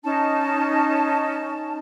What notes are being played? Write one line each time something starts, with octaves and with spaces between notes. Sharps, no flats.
C#4 D#4 A5